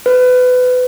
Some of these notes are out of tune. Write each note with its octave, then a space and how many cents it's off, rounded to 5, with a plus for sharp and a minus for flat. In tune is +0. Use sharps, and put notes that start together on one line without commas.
B4 +25